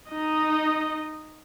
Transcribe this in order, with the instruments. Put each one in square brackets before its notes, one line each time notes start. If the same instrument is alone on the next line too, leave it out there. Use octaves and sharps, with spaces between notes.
[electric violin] D#4 D#5